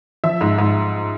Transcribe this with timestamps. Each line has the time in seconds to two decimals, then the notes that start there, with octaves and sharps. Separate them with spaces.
0.24 F3 E5
0.41 G#2
0.58 G#2